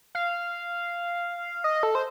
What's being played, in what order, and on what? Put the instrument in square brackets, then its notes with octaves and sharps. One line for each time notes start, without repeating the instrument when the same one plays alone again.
[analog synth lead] F5
D#5
A4
C5